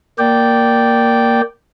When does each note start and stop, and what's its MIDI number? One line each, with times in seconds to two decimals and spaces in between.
0.19 1.41 58
0.19 1.41 74
0.19 1.41 79